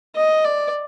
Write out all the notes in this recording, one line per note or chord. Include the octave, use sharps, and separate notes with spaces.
D#5
D5